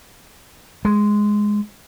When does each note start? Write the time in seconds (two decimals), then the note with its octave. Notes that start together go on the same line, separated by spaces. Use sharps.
0.85 G#3